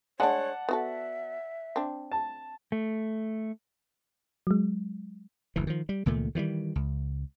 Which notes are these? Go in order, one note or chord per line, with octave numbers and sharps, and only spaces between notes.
G#3 D4 C#5 D5 F#5 A5
B3 F#4 A4 E5
C4 D4
A5
A3
F#3 G#3
F#1 D2 E3
D#3 F3
G3
C#2 A#2 D#3 A3
D#3 E3 F#3 G3
C#2